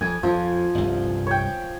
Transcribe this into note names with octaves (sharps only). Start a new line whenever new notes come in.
F2 G#5
F2 F3
G1 C2
C#5 G5